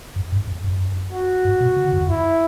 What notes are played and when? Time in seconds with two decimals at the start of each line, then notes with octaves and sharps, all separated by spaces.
0.16 F#2
0.32 G2
0.47 F#2
0.64 F#2
1.12 F#4
1.45 G2
1.60 B2
1.76 C#3
1.85 D3
1.93 F#2
2.01 E2
2.09 F#2 E4